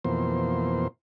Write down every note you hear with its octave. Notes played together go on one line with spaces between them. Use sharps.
F2 B2 E3 A#3 C5